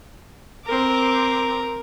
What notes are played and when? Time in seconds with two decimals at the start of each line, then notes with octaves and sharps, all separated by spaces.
0.66 C4 A#4 D6